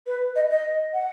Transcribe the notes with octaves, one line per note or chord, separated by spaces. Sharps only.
B4
D#5
D#5
F#5